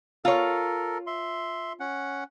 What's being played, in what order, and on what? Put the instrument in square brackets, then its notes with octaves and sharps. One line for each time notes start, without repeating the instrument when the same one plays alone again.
[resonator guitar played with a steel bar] F4 C#5 [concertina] A4 A#4
[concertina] E5 C6
C#4 F#5